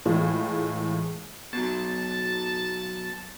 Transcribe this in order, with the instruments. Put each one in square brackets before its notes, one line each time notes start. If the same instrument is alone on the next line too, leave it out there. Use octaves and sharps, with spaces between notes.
[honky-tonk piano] A2 E3 G#3 F4
[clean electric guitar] B2 F#3 [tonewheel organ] A5 A6